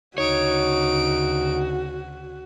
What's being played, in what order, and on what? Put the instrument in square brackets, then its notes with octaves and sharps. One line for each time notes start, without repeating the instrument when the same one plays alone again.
[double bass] D2 C#3 [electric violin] D#4 D7 [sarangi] F#4 [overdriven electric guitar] C#5